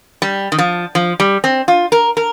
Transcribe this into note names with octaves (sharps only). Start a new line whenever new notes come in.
G3
D#3
F3
F3
G3
C4
F4
A#4
A#4